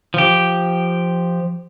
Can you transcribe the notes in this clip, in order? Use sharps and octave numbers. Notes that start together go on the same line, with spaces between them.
F3 G4